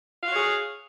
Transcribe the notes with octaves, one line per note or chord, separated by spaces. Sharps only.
F#4 G#4 C#5 F5